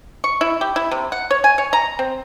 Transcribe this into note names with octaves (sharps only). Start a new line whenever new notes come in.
C#6
E4
G4
E4
C3
F#5
C#5
G#5
C#5
A#5
C4